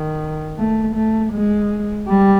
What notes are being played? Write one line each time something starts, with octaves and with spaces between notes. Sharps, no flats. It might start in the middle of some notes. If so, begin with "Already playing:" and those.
Already playing: D#3
A3
A3
G#3
G3